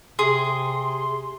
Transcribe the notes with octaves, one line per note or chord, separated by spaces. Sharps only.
C3 G#4 C6